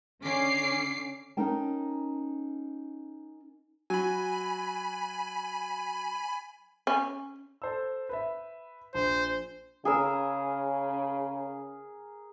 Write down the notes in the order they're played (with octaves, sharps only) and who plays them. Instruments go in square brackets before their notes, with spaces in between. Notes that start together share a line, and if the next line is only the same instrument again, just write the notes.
[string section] D3 C#4 D6 C7
[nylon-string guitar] C#4 D#4 A#4 G5 A5
[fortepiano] F#3 [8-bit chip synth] G#5 B5
[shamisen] C#4
[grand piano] A4 C5 E6
B4 E5
[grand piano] A#1 [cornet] C5
[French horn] C#3 [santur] G#4 A#4 E6